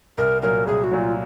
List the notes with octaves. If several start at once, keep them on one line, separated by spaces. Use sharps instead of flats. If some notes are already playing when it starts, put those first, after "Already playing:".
C2 A#4
A#2 F#3 A#4
C2 G#4
F#4
A#2 F#3
F4